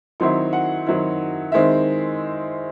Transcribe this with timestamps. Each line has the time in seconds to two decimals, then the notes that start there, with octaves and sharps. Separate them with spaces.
0.20 D#3 F#3 C4 E4 C6
0.53 F#5
0.86 D#3 F#3 C4 E4
1.52 D#3 G#3 C4 E4 E5